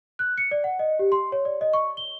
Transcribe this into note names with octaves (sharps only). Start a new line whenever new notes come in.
F#6
C#7
D5
F#5
D#5
G4
C6
C#5
D5
D#5
C#6
G7